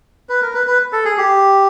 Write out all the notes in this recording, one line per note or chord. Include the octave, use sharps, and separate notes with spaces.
B4
A#4
B4
B4
A4
G#4
G4